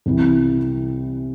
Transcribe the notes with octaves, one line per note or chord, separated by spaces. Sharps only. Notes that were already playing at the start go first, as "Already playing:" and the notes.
C2 C3 E3